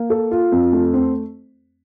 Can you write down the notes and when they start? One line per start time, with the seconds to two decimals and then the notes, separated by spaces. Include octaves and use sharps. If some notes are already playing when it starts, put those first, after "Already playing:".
Already playing: A#3
0.10 A4
0.31 F4
0.52 F2
0.73 A3
0.94 C4